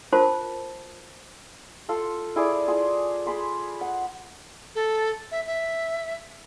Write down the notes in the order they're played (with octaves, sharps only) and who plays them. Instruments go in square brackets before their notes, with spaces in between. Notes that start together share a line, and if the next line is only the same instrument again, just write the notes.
[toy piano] F4 F#4 A#4 C5 A5
[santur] F4 A4 F5
E4 G#4 D5
F4 G#4
G#4 B5 C6
F#5
[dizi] A4
E5
E5